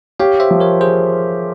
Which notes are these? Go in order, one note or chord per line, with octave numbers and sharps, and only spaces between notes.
G4 C#5 F5
C5 E5
F3
A#4 C#5
G#4 C5